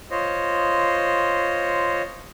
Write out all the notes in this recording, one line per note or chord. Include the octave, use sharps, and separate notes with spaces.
F4 C5 C#5 D#5